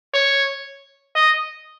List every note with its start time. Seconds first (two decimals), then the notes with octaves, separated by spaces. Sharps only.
0.14 C#5
1.15 D#5